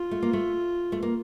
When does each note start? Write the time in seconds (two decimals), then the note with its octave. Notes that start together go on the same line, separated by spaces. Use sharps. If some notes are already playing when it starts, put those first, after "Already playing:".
Already playing: F4
0.11 A3
0.22 A#3
0.33 A3
0.92 A3
1.03 A#3